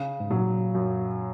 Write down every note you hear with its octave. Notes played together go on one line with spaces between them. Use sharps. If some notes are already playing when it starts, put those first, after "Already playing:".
Already playing: C#3
G#2
A#2 F#3
F#2